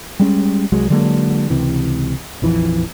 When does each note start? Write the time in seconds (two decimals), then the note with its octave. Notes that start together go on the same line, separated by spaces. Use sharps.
0.19 G3 G#3 C#4
0.72 C2 F#3 G#3
0.90 D3 F#3 G#3 A#3
1.50 C#2 C3 E3
2.42 A#1 F2 E3 F3